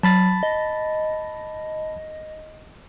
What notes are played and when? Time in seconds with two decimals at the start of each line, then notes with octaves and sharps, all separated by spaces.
0.03 F#3 A5 B5 A6
0.43 D#5